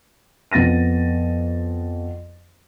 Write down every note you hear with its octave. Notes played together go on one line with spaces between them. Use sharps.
F2 B3 A6 A#6 D#7